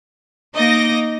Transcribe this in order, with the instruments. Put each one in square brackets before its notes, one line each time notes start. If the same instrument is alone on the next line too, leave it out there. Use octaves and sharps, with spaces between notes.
[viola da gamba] A#3 D#4 [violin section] D#5 D6 A#6